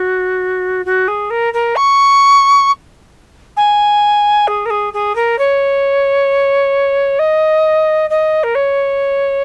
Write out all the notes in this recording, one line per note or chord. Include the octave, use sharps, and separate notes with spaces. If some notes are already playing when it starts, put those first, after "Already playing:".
Already playing: F#4
F#4
G#4
A#4
A#4
C#6
G#5
G#4
A#4
G#4
G#4
A#4
C#5
D#5
D#5
A#4
C#5